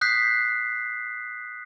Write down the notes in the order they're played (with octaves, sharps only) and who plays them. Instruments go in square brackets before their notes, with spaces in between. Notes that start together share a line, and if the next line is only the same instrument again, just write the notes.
[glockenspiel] D#6 F#6 G6 B6 C7